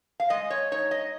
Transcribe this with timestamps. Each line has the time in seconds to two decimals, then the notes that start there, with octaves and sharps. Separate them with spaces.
0.20 F5
0.30 G#3 D#5
0.50 C#5
0.71 D#4 C#5
0.91 D#5